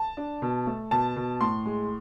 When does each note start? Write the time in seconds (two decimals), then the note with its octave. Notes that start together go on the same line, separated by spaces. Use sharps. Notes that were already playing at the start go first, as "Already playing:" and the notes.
Already playing: A5
0.17 D4
0.42 B2
0.67 A3
0.91 B2 A5
1.16 B2
1.41 A2 C6
1.66 G#3